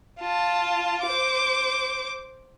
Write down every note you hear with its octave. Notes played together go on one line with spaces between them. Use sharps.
F4 A5
C5 D6